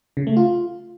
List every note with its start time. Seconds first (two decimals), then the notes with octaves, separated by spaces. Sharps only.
0.17 C#3
0.27 A3
0.37 F4